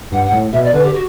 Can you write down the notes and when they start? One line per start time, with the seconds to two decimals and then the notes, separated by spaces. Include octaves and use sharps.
0.12 G2 F#5
0.25 F#5
0.32 A2
0.52 B2 E5
0.63 D5
0.73 D3 B4
0.83 G4
0.94 F#4